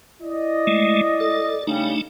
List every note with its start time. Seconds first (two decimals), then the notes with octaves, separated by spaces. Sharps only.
0.22 E4 D5 D#5
0.67 G#3 A3
1.20 A4
1.67 C#3 G3 A3 D4 D#4